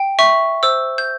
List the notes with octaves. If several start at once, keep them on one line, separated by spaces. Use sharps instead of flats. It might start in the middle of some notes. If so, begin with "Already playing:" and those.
Already playing: G5
E5 C#6
C5 E6
G6